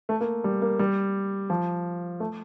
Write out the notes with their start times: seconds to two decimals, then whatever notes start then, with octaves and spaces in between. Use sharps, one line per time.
0.09 A3
0.21 A#3
0.44 G3
0.62 A#3
0.79 G3
1.50 F3
2.20 A3